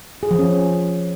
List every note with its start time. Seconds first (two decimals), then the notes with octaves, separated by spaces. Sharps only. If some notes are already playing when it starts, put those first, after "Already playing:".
0.23 G#4
0.31 F3
0.39 C#4